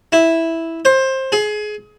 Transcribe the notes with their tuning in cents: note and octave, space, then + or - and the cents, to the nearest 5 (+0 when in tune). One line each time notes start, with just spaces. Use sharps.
E4 -5
C5 +20
G#4 +25